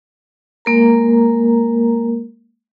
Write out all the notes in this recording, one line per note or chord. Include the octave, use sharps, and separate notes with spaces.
G#3 A#3 A#4 A#5